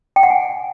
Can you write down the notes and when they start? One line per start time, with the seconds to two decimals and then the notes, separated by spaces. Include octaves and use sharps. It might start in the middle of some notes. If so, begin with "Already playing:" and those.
0.16 G5
0.23 F#5
0.30 G#5